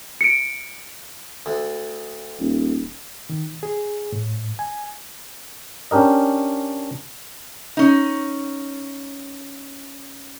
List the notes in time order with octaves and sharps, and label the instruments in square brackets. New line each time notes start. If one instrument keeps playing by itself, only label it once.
[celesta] C#7 D7
[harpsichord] D2
[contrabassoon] D#1
[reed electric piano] D#3
G#4
A2
G#5
[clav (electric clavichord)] C#4 D4 G4 A#4 D#5
[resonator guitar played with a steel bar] C#4 D#4